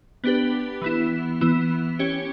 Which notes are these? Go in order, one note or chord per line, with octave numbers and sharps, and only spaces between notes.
B3 D4 G4 B4
E3 B3 E4
E3 B3 E4
C#4 G4 C#5